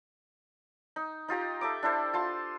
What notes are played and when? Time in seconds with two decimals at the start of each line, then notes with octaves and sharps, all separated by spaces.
0.96 D#4
1.28 D#4 F4 G4 A#5
1.61 A4 E5 D6
1.83 D4 E4 A4 C5
2.14 F4 A5 C6